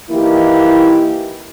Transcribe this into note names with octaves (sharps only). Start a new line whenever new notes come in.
E3 A#3 D#4 E4 G4